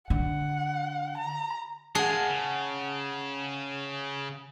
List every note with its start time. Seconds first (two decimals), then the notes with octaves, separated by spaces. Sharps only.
0.10 D3 F#5
1.18 A#5
1.95 G#3 A#3 G#4 F#5 A5
2.29 C#3